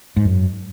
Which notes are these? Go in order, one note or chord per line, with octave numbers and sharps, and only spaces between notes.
G#2
F#2